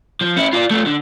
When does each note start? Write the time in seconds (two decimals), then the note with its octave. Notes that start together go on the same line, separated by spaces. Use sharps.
0.21 F3
0.36 C#4 E4
0.53 F4 D5
0.71 A3 F4
0.86 D3